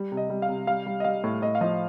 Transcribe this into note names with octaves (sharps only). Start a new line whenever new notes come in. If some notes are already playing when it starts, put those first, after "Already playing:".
Already playing: G3
C3
D#5
G3
F5
C3
G3 F5
G3
D#5
G3 F5
A2
A2 D#5
F5
F3 D#5